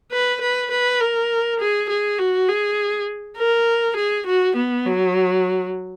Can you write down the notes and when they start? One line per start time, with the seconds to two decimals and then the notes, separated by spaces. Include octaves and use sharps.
0.12 B4
0.41 B4
0.71 B4
1.00 A#4
1.60 G#4
1.89 G#4
2.19 F#4
2.49 G#4
3.38 A#4
3.97 G#4
4.27 F#4
4.56 B3
4.86 F#3